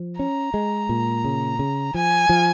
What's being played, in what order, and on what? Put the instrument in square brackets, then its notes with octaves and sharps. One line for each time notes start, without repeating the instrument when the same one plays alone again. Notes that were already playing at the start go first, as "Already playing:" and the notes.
Already playing: [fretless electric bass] F3
[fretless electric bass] C#4 [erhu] A#5
[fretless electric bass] G#3
A#2
C#3
C#3
[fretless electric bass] F3 [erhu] G#5
[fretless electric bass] F3